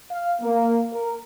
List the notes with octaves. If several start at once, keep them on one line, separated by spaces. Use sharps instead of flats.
F5
A#3
A#4